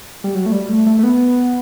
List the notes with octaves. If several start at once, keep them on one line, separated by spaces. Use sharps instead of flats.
G3
F#3
A3
G3
A3
A3
A3
B3